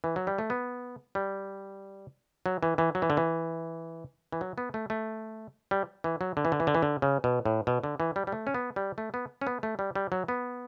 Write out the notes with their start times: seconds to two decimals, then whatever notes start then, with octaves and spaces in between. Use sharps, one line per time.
0.04 E3
0.16 F#3
0.27 G3
0.38 A3
0.50 B3
1.15 G3
2.46 F#3
2.63 E3
2.78 E3
2.95 F#3
3.02 E3
3.10 D3
3.17 E3
4.32 E3
4.41 F#3
4.58 B3
4.74 A3
4.90 A3
5.71 G3
6.04 E3
6.21 F#3
6.37 D3
6.45 E3
6.52 D3
6.60 E3
6.67 D3
6.75 E3
6.82 D3
7.02 C#3
7.24 B2
7.46 A2
7.67 B2
7.84 D3
8.00 E3
8.16 G3
8.27 G3
8.32 A3
8.47 C#4
8.55 B3
8.76 G3
8.98 A3
9.14 B3
9.41 C#4
9.47 B3
9.63 A3
9.79 G3
9.95 G3
10.12 F#3
10.28 B3